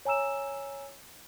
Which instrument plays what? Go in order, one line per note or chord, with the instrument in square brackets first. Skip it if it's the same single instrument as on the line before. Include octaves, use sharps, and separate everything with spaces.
[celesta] C#5 G#5 A#5 E6 E7